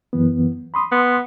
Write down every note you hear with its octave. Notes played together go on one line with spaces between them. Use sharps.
F#2 E3 B3
B5 C6 D#6
B3